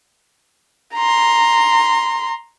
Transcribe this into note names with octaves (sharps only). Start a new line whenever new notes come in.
A#5 C6